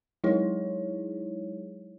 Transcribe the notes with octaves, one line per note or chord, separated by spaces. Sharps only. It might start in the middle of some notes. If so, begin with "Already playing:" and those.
F#3 G#3 D#4 E4 G#4 C#5